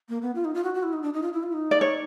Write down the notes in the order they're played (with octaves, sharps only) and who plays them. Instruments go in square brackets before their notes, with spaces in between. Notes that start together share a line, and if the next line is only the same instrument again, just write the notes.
[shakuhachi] A#3
B3
F4
D#4
F4
F#4
F#4
E4
D#4
D4
D#4
F4
E4
F4
D#4
[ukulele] D5
C#5